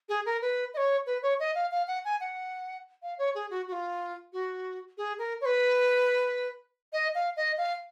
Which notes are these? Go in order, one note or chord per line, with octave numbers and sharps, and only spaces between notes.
G#4
A#4
B4
D#5
C#5
B4
C#5
D#5
F5
F5
F#5
G#5
F#5
F5
C#5
G#4
F#4
F#4
F4
F#4
G#4
A#4
C#5
B4
D#5
F5
D#5
F5